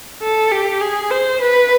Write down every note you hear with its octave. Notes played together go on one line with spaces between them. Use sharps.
A4
G4
G#4
C5
B4